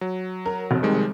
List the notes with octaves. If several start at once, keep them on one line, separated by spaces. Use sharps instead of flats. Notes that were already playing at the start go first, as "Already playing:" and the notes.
F#3
A#4
F1
D#3 G3 G#3